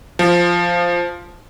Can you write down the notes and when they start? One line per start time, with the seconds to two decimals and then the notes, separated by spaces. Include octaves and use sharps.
0.19 F3